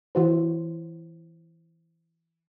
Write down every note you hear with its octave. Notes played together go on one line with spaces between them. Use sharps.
E3 F#4 C5